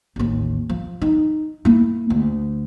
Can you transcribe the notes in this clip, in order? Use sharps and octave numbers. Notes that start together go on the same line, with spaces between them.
A1 D#2
F3
D#4
A#3 E4
D2